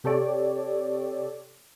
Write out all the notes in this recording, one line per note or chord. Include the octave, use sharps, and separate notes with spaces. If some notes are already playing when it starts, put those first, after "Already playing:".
C3 G4 A4 C#5 D5